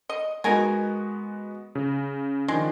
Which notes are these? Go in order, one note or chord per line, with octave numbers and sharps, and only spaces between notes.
D#5
G#3 B3 D#4 F#4 A#4 G#5
C#3
D#3 F3 G#3 D4